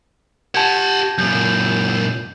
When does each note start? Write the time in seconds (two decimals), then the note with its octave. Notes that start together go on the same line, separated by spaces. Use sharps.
0.55 G4 F#5 A5 G6 G#6
1.18 F#2 A#2 G6